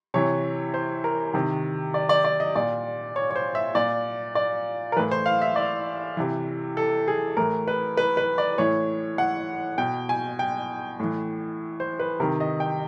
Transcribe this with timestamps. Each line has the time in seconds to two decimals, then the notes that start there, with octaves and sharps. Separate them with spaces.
0.14 C3 E3 C#5
0.74 C5
1.04 A#4
1.34 C3 D#3
1.94 D5
2.09 D5
2.25 D5
2.40 D#5
2.56 A#2 D5
3.16 C#5
3.31 C#5
3.36 C5
3.55 E5
3.75 A#2 D5
4.35 D5
4.92 A#4
4.96 E3 B4
4.99 A2
5.11 C5
5.26 F5
5.42 E5
5.56 D5
6.17 C3 E3
6.77 A4
7.08 G#4
7.37 A2 E3 A#4
7.68 B4
7.97 B4
8.17 B4
8.38 D5
8.58 A2 E3 C#5
9.18 F#5
9.78 B2 G5
10.09 G#5
10.39 G5
11.00 A2 E3
11.80 C5
11.99 B4
12.20 C3 A#4
12.23 D#3
12.40 D#5
12.60 G5